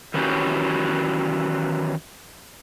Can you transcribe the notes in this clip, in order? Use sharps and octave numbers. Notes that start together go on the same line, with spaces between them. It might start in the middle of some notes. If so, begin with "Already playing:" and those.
D#3 E3 F#3 C#4 F#4 G4